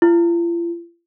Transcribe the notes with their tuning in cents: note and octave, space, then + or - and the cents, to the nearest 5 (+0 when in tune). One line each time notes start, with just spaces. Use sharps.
F4 -45